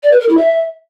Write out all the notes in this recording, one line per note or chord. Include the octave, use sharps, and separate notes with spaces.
D5
B4
A#4
E4
E5